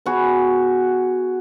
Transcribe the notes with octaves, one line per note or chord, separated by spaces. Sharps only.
B3 F#4 G#4